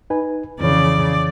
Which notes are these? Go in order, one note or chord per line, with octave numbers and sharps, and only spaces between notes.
D#4 B4 G#5
F2 C#3 E3 C#5 D5